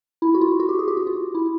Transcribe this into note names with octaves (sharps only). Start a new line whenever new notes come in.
E4
F#4
F4
F#4
G4
G#4
G4
F#4
F4
E4